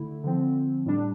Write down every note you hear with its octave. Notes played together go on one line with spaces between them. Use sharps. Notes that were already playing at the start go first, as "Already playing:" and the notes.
Already playing: D3 A3 E4
D3 F3 C4
A2 G3 D4